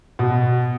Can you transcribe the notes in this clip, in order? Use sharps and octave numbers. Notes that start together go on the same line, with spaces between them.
B2